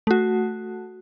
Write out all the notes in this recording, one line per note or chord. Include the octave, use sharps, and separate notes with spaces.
A3 F#4